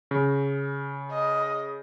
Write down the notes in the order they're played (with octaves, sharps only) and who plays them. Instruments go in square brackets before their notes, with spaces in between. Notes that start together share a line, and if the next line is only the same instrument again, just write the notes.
[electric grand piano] C#3
[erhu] D#5